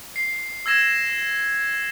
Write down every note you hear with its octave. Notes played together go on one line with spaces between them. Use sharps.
C7
E6 G#6 A#6 E7